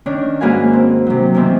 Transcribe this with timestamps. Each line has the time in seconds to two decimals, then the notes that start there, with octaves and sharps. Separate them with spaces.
0.06 D#3 C#4 D4
0.41 G#2 A#3 F#4 B4 F5 G#5
0.73 C4
1.07 C3 F#3
1.34 D#3 E3 B3 C4